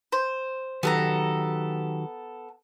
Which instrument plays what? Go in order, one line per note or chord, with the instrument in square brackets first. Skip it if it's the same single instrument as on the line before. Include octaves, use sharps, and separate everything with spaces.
[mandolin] C5
[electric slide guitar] D#3 F#3 G4 [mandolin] B3 A4 A#5